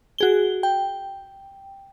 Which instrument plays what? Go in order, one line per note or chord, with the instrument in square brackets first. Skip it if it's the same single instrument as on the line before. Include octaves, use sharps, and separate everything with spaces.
[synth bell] F#4 G#4 G7
G5